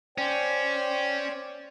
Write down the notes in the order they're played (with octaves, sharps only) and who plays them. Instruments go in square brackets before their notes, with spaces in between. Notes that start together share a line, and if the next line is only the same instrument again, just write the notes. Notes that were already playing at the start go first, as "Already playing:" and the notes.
[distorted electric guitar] C#4 [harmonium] C5 D5 G5